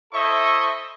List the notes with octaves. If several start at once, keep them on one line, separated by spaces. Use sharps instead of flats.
E4 A4 C5 D#5 E5 C#6